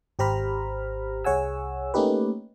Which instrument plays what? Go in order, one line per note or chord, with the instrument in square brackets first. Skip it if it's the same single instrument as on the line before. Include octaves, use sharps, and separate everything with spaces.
[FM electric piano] G#1 G4 C5 A#5 B5 F6
C2 G#4 C#5 F#5 G#5 E6
A3 A#3 C#4 D#4 G4 B4